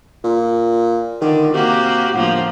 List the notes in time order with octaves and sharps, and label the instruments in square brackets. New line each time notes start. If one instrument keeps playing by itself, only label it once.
[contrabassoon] A#2
[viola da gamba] D3 [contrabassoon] D#3
[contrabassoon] C3 [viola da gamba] A#3 F#4 G4
[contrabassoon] G1 [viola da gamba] A2 F3 A#3